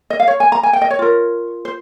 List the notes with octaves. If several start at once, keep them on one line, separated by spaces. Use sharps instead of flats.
D#5
F5
C#5
G#5
A#5
G#5
G5
D#5
C#5
F4 A#4
C5